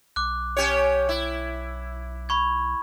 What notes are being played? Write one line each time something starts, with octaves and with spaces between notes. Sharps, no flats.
B1 D6 F#6
C#4 G4 C#5
E4
B5 C#6 G#6